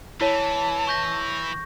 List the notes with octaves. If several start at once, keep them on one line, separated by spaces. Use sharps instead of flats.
E3 E4 C#5 A5 D#7
C#6 G6 A#6